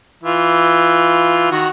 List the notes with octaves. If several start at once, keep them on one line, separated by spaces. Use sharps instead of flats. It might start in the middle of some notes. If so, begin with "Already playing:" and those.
E3 F4
D#3 F#4